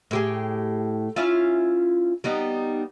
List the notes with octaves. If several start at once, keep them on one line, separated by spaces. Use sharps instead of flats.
A2 G4 G#4
C#4 E4 F4
G3 B3 D#4